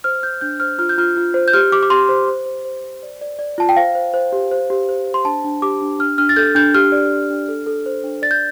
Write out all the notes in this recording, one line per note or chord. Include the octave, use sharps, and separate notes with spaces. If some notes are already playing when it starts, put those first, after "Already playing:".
C5 F6
C5 G6
D4 G6
C5 F6
F4 F6
G6
F4 F6
F4
C5
G6
G4 F6
G4 D6
D6
G4 C6
C5
C5
C5
C5
C5
D5
D5
D5
F4 A5
G5
C5 F5
C5
C5
G4
C5
G4
C5
C5
C6
D4 A5
D4
G4 D6
D4
D4 F6
D4 F6
A6
A4 G6
D4 G6
G4 F6
D5
G4
D4
A4
A4
C5
D4
D5 A6
G6